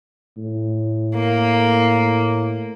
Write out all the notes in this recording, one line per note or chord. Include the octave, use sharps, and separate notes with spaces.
A2
A#3